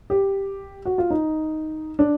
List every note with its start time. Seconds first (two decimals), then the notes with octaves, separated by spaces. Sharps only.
0.10 G4
0.85 F#4
0.98 F4
1.10 D#4
1.99 D4